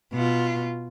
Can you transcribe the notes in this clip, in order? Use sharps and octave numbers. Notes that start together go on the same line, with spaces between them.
B2 F4